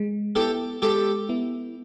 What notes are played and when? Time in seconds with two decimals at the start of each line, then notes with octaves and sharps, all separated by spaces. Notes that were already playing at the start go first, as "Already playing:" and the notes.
Already playing: G#3
0.35 B3 E4 G4 A4
0.82 G#3 G4 A4
1.29 B3 E4